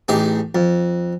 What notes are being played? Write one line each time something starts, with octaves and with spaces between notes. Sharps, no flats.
A1 D#4 G4 G#4
F2